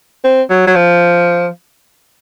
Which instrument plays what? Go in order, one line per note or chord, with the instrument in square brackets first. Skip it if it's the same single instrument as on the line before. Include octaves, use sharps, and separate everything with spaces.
[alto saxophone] C4
F#3
F#3
F3